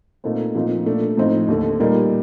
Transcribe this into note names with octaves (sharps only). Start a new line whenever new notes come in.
A#2 A3 C4 D#4
A#2 F3 C4 D#4
A#2 A3 D4
A2 F3 C4 D#4
D#2 D3 A3
A#2 G3 A#3 D#4